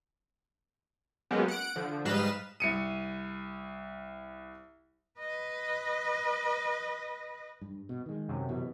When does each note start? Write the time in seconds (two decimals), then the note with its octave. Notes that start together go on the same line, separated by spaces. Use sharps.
1.31 F#3 G#3 A#3 B3 C#4 G4
1.48 F#5 D7
1.76 D3 F3
2.05 G#2 G3 B4 D#5 F5 E7
2.60 C2 C#7 D#7
5.19 B4 D#5
7.61 G2
7.89 B2
8.06 D#3 G#3
8.28 F#2 C3
8.49 B2 E3